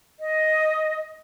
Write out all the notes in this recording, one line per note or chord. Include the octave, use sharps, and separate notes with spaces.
D#5